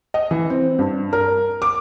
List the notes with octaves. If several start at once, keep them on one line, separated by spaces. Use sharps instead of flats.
D#5
E3
C4
G2
A#4
D6